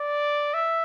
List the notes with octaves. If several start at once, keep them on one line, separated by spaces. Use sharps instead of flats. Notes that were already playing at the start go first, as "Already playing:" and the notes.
Already playing: D5
E5